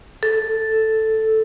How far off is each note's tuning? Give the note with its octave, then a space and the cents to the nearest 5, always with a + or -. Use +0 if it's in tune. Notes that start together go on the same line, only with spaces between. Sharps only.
A4 +0